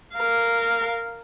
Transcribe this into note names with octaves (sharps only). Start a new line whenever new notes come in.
A#4 F5